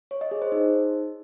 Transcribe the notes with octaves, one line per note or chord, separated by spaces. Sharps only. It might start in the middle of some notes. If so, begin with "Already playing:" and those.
C#5
D#5
G#4
C5
D#4